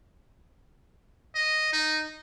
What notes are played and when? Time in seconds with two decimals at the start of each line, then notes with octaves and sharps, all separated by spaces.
1.35 D#5
1.73 D#4